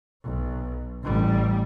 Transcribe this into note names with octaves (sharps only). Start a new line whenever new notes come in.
B1
A1 G3